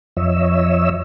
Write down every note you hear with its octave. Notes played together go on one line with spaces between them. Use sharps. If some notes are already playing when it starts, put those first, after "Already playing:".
F2 F3 C#5 D#5 E5 E6